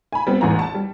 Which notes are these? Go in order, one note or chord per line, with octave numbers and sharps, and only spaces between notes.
G#5 B5
G3 B3 C4
A1 E2 G#5 A#5
A5
G3